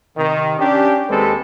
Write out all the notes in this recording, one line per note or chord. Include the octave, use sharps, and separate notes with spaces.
C3 D#3
C#4 D4 G4
D#2 G#3 C4 G4 A4 B4